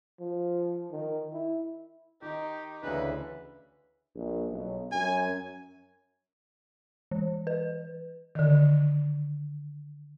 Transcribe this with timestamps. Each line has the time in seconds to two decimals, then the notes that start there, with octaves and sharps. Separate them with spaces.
0.20 F3
0.91 D#3
1.33 E4
2.22 D#3 D#4 G4
2.83 D2 C#3 E3 D4 B4
4.16 A#1
4.51 B1
4.92 F#2 G#5
7.11 E3
7.47 B4
8.35 D3 D#3